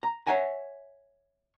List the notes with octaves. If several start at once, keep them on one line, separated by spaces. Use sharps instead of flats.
A#5
C#5 D5 E5 F#5 G#5 A#5